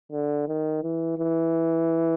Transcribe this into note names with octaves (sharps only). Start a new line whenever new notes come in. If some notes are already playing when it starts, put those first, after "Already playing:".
D3
D#3
E3
E3